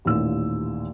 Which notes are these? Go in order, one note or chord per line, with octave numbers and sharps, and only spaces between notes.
A1 D#2 A#2 E6